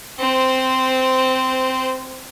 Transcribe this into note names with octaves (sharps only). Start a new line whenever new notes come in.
C4 C5